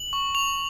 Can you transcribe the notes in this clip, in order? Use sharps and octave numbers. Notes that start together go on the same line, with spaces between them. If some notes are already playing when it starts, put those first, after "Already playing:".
Already playing: F#7
C#6
C#6 F7